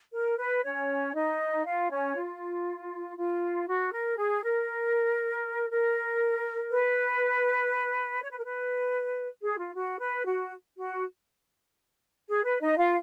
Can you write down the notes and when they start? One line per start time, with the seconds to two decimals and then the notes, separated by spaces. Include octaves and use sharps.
0.13 A#4
0.38 B4
0.64 C#4 C#5
1.14 D#4 D#5
1.65 F4 F5
1.90 C#4 C#5
2.16 F4
3.17 F4
3.68 F#4
3.93 A#4
4.17 G#4
4.44 A#4
5.70 A#4
6.71 B4
8.22 C#5
8.31 B4
8.38 A#4
8.45 B4
9.41 G#4
9.57 F4
9.75 F#4
9.99 B4
10.26 F#4
10.76 F#4
12.28 G#4
12.44 B4
12.61 D#4 D#5
12.77 F4 F5